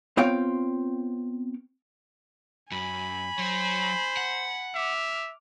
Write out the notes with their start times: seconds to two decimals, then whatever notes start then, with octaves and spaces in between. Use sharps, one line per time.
0.17 B3 C4 F4 C#5 F5 G5
2.72 F#2 G#5 B5
3.39 F#3 C5 C#5
4.17 F#5
4.75 E5 D6 F6